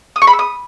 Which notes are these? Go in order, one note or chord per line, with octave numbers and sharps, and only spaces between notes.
D#6
C#6
B5
E6
D#6